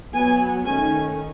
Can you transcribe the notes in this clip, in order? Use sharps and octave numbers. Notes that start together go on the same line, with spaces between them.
F#3 B3 G#5
D#3 A3 C#4 G#5